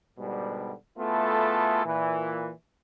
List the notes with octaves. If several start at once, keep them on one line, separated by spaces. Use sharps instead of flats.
G#2 B2 D3 G3
A3 B3 E4 F4 G#4 A4
A#2 E3